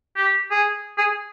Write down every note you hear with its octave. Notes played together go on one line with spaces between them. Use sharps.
G4
G#4
G#4